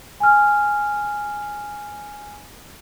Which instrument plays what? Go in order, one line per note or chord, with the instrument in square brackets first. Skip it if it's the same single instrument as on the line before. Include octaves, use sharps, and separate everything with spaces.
[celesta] G#5 F6